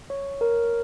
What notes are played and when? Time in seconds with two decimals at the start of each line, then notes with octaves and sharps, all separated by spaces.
0.10 C#5
0.41 A#4